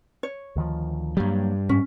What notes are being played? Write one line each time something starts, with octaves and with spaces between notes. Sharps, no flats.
C#5
D2 D#3 F3
G2 F#3 G3 A#3
G#2 C#4